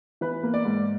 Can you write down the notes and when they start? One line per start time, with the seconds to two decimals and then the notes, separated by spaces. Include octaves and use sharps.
0.21 E3 B4
0.43 A#3
0.54 D5
0.65 G#2